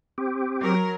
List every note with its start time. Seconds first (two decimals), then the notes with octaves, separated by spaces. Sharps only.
0.18 C4 G4
0.62 F#3 A#4